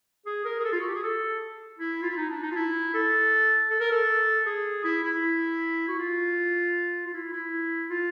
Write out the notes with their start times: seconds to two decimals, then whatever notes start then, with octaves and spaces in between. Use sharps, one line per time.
0.26 G#4
0.45 A#4
0.59 G#4
0.64 A4
0.72 F4
0.80 F#4
0.88 G4
0.95 G#4
1.03 A4
1.79 E4
2.02 F4
2.10 E4
2.17 D#4
2.30 D4
2.43 D#4
2.51 F4
2.56 E4
2.94 A4
3.70 A4
3.80 A#4
3.91 A4
4.46 G#4
4.84 E4
5.04 E4
5.88 F#4
5.99 F4
7.07 F4
7.14 E4
7.33 E4
7.90 F4